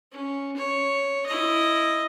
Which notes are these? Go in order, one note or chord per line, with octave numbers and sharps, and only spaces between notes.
C#4
C#5
E4 D#5